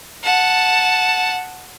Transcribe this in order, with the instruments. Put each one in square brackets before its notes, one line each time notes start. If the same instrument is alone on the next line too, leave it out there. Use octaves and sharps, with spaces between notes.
[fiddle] F#5 A5